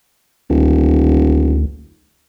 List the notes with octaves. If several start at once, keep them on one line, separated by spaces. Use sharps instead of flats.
D#1 D2